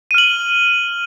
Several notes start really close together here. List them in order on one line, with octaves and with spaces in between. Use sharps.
D#7 F6 F#7